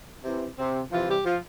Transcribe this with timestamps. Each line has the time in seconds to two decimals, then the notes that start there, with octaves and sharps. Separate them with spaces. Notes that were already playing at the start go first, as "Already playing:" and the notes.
0.25 C3 E3
0.58 C3 C4
0.92 C3 E3 F3 F4
1.09 G3 G4
1.25 F3 F4